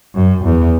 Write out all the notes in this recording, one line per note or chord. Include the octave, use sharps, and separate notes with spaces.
F#2
E2